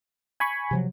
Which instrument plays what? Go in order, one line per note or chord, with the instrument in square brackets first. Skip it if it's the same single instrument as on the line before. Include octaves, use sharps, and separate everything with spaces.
[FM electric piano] G#5 B5 C#6
[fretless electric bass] C3 F3 F#3